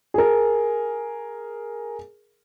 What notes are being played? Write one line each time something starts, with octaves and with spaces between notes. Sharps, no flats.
G#4 A#4